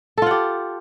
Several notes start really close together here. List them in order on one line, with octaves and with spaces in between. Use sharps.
A4 F4 F#5 G4